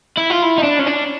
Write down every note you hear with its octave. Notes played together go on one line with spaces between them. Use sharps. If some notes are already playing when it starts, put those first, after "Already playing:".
E4
F4
E4
D#4
D4
C#4
D4